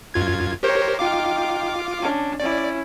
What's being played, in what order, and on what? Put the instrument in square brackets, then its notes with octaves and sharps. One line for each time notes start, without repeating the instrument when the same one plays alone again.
[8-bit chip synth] F#2 F4 G#6
[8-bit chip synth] G4 A#4 C5 [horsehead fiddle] C#5
[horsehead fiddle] D#4 G5 [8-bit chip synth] F4 F5 D6
[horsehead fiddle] C#4 D4
[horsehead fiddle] C#4 E4 [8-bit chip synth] D5